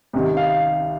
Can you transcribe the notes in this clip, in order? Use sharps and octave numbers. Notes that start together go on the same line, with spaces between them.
C2 C3 D#3
F5